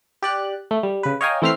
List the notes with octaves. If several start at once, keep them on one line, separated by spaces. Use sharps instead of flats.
G4 D5 F#6
A3
G3
C#3 B4
C#5 D#5 F5 G5 G#5 A#5
E3 A3 C4 E5 F6 C7